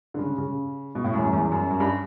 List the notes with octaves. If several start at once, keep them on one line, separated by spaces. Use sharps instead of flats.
D3
C#3
C#3
B2
A2
F#2
E2
F#2
E2
F#2
F#2
G2